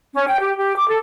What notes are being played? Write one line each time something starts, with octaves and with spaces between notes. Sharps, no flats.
C#4
G5
G4
G4
D6
A4